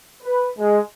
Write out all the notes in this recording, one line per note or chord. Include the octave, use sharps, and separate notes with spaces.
B4
G#3